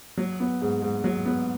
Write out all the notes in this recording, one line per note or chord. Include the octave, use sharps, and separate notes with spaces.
F#3
B3
G#2
G#2
F#3
B3